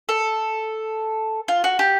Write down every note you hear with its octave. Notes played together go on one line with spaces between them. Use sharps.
A4
F4
F#4
G4